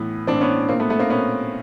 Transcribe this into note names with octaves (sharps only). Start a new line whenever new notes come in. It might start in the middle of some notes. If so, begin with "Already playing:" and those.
Already playing: A2 E3 B3
A2 E3 C4 D4
B3 C#4
A#2 A#3 C4
A3 B3
A3 B3
A#3 C4
A#2 B3 C#4